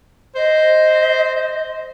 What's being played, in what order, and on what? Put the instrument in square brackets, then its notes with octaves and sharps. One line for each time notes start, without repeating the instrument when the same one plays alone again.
[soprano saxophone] C5 [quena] D#5